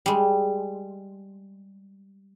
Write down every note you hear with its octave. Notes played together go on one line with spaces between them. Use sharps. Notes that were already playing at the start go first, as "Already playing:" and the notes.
G3 G#3